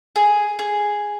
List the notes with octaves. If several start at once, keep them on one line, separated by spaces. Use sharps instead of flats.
G#4
G#4